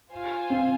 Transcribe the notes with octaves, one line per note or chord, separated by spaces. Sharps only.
F4 C5 F5 G#5
C4